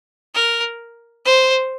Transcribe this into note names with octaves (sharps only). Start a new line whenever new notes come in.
A#4
C5